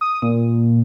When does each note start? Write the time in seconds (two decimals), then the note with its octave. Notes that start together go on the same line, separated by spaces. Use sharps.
0.01 D#6
0.22 A#2